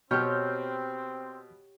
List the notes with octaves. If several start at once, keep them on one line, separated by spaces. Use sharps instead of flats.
B2 C4 G4 C#5 F6 G6